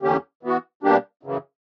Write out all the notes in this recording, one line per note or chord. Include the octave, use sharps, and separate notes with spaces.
E2 D3 A#3 C#4 G4
E3 B3 F#4
B2 G3 A#3 D4 G4
F#2 C#3 E3